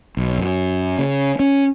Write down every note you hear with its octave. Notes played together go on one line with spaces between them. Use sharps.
B1
F#2
C#3
C#4